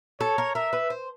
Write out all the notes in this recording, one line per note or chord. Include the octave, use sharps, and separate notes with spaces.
A4 C#5
A#4
A#4 E5
B4
C5